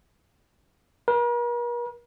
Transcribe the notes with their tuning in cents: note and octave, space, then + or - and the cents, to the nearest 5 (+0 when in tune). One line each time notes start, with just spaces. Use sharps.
A#4 +45